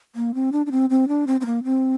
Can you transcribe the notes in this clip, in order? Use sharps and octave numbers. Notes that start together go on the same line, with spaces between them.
A#3
C4
D4
D4
C4
C4
D4
C4
C4
A#3
C4